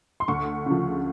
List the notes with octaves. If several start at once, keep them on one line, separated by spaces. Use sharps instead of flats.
C6
D2 C#6
C#3 F3